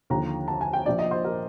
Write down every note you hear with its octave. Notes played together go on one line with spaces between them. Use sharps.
D#2 D3 F3 A#5
A5
G#5
G5
A#1 A#2 F3 D5
D#5
C5
A#4